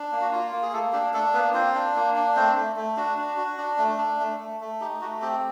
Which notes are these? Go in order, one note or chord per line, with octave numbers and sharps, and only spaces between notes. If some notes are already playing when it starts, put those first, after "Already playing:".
Already playing: D4
A#3
F#4
F4
A#3
G#4
A3 A#3 A4
D4 G4
A3 D4 A4
A#3 B3 B4
C4 F4 C5
D4
A#3
D4
A3 C4 C5
A3
A3
D4 F#4
D4
F#4
D4
A3
D4
A3
A3
A3
D#4 G4
A3 F#4
C4 G4